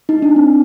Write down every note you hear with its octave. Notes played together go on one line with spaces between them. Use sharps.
D#4
D4
C4